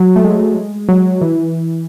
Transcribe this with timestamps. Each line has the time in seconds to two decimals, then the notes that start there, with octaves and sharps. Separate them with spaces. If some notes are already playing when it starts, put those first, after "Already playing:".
Already playing: F#3
0.16 A3
0.24 G#3
0.89 F#3
1.21 E3